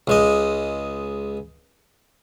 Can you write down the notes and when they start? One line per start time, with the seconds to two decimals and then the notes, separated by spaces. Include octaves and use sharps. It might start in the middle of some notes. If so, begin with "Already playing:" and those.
0.07 C#2 G#3 D#5